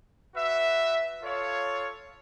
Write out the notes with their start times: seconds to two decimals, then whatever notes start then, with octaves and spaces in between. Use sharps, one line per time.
0.34 F#4 B4 E5
1.21 F4 A4 C#5 F5